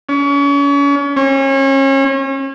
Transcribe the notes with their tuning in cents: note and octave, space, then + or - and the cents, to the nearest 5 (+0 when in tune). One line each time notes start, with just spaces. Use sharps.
C#4 +35
C#4 -35